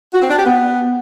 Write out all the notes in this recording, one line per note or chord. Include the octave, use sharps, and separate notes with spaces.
F#4
C4
D4
G4
B3